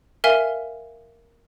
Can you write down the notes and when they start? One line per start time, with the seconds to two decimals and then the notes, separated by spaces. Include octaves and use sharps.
0.24 A#4 E5 F5 G#5 F6